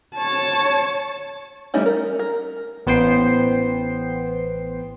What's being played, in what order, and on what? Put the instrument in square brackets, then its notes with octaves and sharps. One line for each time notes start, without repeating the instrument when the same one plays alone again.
[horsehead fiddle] C#5 A5
[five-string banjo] E3 G3 A3 C#4 D#4
A#4
A#4
[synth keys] A1 B3 C5 G5 C7